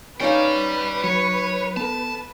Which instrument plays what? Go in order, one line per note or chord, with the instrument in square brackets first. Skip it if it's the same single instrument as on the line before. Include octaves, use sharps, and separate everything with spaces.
[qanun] C#4 D#4 F5 [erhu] B4 [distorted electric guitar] D5 G5
[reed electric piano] F#3 [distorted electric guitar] C#5
[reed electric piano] B3 A4 [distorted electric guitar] A5